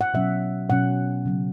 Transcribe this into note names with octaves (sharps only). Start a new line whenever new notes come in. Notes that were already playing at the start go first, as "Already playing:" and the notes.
F#5
B2 F#3 C#4 E5
B2 F#3 C#4 F#5
C#3 F#3 B3